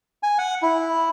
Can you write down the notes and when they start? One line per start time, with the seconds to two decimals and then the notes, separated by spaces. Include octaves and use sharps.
0.23 G#5
0.38 F#5
0.62 E4